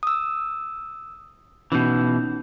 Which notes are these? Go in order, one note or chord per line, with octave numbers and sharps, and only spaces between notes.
D#6 E6
B2 E3 C#4 D#4 G6